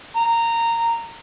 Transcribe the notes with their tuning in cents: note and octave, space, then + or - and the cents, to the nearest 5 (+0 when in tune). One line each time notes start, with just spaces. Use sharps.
A#5 -15